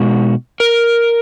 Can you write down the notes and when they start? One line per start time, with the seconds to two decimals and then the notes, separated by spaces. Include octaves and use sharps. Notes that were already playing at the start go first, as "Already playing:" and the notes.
Already playing: B2 G#3 D#4 F#4
0.60 A#4